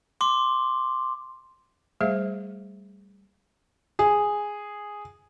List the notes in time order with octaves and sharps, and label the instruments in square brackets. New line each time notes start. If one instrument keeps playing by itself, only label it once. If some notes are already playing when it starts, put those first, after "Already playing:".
[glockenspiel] C6 D6
[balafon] G3 A3 G#4 C5 E5 F5
[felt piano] G#4